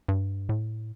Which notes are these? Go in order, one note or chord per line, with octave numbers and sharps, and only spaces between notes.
G2
A2